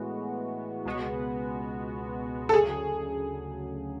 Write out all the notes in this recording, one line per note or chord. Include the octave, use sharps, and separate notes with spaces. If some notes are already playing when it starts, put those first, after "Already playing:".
Already playing: A2 E3 G#3 B3 F#4
C#2 B2 G#3 B3 F#4
A4
D2 C#3 F#3 G#4